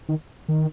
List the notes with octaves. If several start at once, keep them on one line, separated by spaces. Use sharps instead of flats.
D#3
D#3